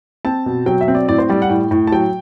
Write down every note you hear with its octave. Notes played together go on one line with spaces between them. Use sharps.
C4 A5
B2
F#3 G5
E5
C4
D5
A2 D5
C5
G3 D5
F#5
A2 G5
A2
A5
F#3 G5